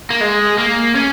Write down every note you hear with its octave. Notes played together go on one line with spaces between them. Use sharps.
A#3
G#3
A#3
C#4